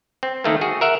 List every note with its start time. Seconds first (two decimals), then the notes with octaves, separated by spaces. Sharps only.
0.23 C4
0.44 D#3 A3 A#3
0.61 F#4 G#4
0.81 A#4 E5 F#5